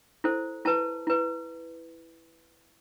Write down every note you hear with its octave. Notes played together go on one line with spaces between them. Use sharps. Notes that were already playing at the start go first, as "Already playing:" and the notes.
E4 A4 C5
E4 B4 A5
E4 B4